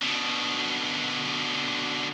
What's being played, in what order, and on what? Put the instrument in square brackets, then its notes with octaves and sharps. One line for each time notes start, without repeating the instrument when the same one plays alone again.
[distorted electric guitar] B2 D3